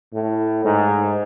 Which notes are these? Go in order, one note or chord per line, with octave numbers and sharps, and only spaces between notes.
A2
G#2